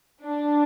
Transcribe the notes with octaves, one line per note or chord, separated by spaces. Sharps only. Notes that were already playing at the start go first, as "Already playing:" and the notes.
D4